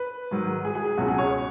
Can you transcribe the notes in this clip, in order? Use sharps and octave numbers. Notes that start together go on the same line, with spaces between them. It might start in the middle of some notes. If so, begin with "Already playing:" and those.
Already playing: B4
G#2 D#3 F#3
G#4
G#4
G#4
C#2 B2 F#3 C#4 F#4
G#4
C#5
C#5